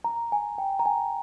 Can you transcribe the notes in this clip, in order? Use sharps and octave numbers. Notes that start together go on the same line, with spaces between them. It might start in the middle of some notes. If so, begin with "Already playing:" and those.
A#5
G#5
G5
A#5
G#5